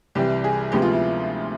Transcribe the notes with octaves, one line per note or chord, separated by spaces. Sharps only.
C2 C3 E3 G3 G4
G#4
D2 C3 F3 G#3 B3 G4
F4
E4